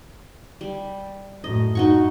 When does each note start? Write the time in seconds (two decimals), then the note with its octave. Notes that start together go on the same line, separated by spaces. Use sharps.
0.61 G3
1.44 F#2 A2 D#5
1.75 F#2 D#4 F#4 C#6